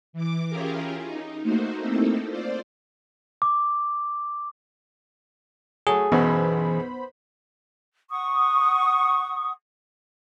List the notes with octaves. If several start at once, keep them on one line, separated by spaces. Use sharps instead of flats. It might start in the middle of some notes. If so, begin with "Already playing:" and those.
E3 D6
C#4 E4 F4 G4 G#4 A#4
D#4
A3 A#3 D#4 F#4 C5
A3 A#3 C4 D#4 E4 A4
F4 C5 D5
D6
F#3 A3 G#4
B1 F#2 B2 E3 B3 C5 B5
F#5 C#6 D#6